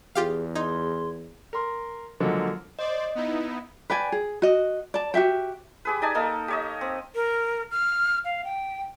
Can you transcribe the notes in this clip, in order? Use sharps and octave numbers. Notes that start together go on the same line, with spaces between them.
E2 F4 G4 G#4 F5
D#4 G#4 C6
A#4 C6
D3 F3 F#3 G#3 A#3
C5 D5 D#5
B3 D#4 E4
B4 D5 G5 G#5
G#4
F#4 D#5
D5 A5
F#4 G4 E5 G5
G4 G#4 B4
D#4 D5 G#5 A5
A#3 D#4 A4 D#5
G4 C#5 D#5
C4
A#4
F6
F5
G5